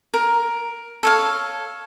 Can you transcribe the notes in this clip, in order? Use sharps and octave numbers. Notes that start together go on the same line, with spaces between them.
A#4
A4 C#5 F5